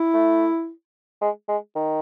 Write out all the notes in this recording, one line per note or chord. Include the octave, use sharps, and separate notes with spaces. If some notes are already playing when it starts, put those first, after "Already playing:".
Already playing: E4
A3
G#3
G#3
D#3